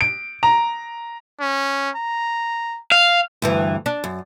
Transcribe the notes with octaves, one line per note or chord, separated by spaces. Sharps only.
D7
A#5
C#4
A#5
F5
D2 G2 E3
D4
F#2